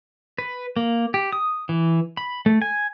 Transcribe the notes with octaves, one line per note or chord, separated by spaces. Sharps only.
B4
A#3
G4
D#6
E3
B5
A3
G#5